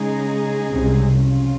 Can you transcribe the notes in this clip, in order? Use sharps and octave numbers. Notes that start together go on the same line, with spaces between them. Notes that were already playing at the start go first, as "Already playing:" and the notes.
Already playing: C#3 G#3 D#4 G#4
C2 C3
F2 C#3 F#3 C#4 F4